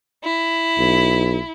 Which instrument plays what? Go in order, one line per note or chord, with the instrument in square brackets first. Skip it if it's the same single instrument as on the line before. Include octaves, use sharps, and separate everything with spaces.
[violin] E4
[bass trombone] B1